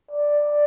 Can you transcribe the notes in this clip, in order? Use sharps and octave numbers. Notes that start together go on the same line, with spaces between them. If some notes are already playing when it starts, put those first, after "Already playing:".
D5